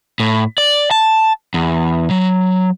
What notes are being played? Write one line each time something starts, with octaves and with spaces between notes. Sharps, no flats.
A2
D5
A5
E2
F#3